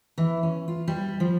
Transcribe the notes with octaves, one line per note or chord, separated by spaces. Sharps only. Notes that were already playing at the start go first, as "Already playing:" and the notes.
E3
C#4
F4
G3
F3